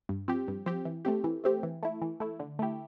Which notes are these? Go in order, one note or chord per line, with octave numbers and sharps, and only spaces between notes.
G2
F3 C4 G4
G2
F3 C4 G4
E3
A3 C4 G4
E3
A3 C4 G4
E3
A3 E4
E3
A3 E4
D3
A3 E4 G4